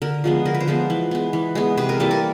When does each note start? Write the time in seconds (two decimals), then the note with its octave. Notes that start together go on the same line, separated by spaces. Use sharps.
0.02 D3 A#4
0.24 F3 G#3 B3
0.45 D3 A#4
0.55 B4
0.60 C5
0.67 F3 G#3 B3
0.90 E3
1.11 G#3 B3
1.33 E3
1.55 G#3 B3
1.77 C3 B4
1.89 A#4
2.00 E3 G3 A#3 A4
2.11 A#4